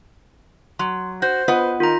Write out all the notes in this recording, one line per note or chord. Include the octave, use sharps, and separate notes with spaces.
F#3 C6
F#4 C5 G6
B3 F4 B4 D#5 F#5
D#3 F4 A#5